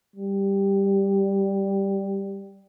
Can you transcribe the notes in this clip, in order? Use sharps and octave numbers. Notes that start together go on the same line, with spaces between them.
G3